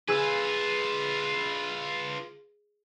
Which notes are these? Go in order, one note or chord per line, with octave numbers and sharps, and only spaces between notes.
F4 G#4 B4 E6